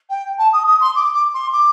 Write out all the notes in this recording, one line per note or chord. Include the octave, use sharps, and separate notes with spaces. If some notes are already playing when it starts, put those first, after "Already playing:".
G5
A5
D#6
D#6
C6
D6
D6
C6
D6